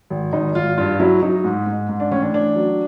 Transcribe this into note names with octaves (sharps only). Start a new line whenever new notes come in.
G#1
G#1 D#4
G#1 F4
G2 F4
F#3 E4
F#3 D#4
G#2
G#2
G#2
D4
A1 C#4
D4
A1 D4
F#3